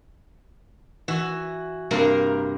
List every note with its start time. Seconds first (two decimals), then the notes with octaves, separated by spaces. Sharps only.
1.08 E3 F#4 E5
1.91 G2 C3 A#3 A#4